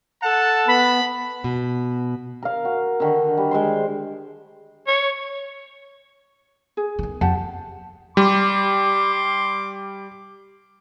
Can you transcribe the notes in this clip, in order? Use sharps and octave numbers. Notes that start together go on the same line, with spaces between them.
A4 F#5 A5
B3 B5
B2
A#4 F5
F#4
D3 D#3 F#4
G3
G#3 C5 C6
C#5
G#4
D#3 B3
F2 G4 F#5 A5
G3 C6 D6